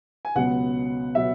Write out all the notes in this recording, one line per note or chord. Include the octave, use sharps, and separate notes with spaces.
G#5
C#2 B2 F#3 B3 F#5
B2 F#3 B3 E5